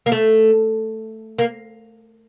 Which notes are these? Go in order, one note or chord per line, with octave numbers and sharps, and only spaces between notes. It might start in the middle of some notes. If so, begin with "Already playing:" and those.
A#3
A3
A#3